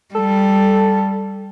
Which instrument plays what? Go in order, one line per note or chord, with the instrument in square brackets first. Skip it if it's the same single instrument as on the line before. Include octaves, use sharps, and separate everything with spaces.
[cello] G3 [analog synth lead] A4